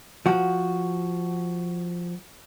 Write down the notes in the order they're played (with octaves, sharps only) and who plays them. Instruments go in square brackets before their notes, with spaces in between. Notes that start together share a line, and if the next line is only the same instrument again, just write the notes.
[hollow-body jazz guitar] F3 F#4